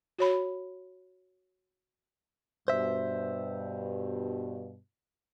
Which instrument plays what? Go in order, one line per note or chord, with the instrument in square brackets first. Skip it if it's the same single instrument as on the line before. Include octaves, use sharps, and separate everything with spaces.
[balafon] F#4 C#5 B5
[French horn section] G2 B2 [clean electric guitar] C5 E5